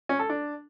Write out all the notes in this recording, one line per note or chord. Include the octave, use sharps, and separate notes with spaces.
C#4
A4
D4